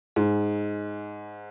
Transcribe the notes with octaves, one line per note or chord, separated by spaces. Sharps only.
G#2